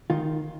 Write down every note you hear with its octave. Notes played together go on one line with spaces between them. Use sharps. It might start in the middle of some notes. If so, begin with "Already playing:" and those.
D#3 F4